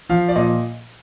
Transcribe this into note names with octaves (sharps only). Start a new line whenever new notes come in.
F3 F5
D5
A#2 D#5